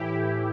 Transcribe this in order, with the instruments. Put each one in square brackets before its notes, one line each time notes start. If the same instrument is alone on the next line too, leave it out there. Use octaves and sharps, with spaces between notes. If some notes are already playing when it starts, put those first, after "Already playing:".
Already playing: [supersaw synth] A2 E3 E4 G4